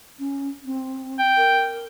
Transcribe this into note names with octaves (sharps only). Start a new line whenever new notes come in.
C#4
C4
G5
A#4